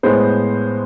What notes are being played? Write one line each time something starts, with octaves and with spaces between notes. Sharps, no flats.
A2 G#3 B3 C5